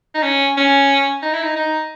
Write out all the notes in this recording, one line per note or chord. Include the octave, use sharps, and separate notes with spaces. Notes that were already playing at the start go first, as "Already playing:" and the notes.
D#4
C#4
C#4
D#4
E4
D#4
D#4